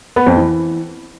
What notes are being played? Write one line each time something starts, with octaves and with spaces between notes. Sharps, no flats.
B3
F2
E3